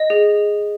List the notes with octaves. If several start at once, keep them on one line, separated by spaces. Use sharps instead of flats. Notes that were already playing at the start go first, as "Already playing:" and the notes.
Already playing: D#5
G#4